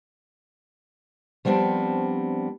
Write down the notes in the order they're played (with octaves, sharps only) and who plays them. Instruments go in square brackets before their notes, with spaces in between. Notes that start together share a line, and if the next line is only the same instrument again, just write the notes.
[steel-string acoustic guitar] F3 G3 B3 C4 D4